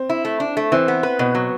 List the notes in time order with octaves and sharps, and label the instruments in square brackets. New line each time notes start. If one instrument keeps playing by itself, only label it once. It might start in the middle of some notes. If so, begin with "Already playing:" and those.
Already playing: [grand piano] C4
[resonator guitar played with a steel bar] E4
A3
D4
A3
[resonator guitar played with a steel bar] E3 [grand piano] C4
[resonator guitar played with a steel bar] B3
B4
[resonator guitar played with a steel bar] B2 [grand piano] B3
[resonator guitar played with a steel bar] F#3